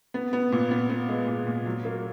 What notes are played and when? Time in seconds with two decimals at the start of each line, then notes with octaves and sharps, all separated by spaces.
0.14 B3
0.33 B3
0.52 A#2
0.71 B3
0.90 B3
1.09 G#3
1.28 A#2
1.47 A#2
1.66 F#3
1.85 A#3